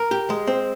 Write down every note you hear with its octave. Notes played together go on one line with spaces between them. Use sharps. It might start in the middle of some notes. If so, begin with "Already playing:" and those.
Already playing: A#4
G4
G#3
C4